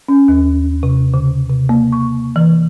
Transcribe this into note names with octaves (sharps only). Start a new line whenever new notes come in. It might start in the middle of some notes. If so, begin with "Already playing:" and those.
C#4
D#2
C3
C#3
C3
A#3
C#6
E3